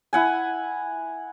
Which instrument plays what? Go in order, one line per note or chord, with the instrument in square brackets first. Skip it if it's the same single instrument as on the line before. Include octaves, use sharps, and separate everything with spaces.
[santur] E4 F#5 G#5